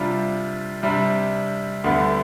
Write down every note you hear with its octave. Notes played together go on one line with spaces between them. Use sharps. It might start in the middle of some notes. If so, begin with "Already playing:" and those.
Already playing: C3 G3 D4 F4
C3 G3 D4
D2 D3 G3 B3